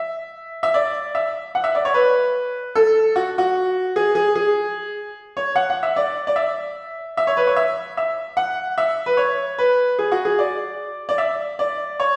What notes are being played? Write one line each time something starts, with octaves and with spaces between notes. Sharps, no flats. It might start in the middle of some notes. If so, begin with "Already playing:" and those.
Already playing: E5
E5
D5
E5
F#5
E5
D5
C#5
B4
A4
F#4
F#4
G#4
G#4
G#4
C#5
F#5
F#5
E5
D5
D5
E5
E5
C#5
B4
C#5
E5
E5
F#5
E5
B4
C#5
B4
G#4
F#4
G#4
D5
D5
E5
D5
C#5